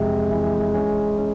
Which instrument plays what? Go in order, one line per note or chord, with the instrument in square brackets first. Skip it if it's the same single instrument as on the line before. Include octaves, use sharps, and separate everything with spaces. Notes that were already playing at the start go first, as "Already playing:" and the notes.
Already playing: [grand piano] F2 C3 E3 [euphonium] G#3
[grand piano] E3
C#4
C#4